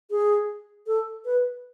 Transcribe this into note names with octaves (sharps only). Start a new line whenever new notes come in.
G#4
A4
B4